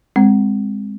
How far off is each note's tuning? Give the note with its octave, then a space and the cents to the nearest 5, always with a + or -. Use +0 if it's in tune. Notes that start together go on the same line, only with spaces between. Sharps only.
G#3 -20 C4 +0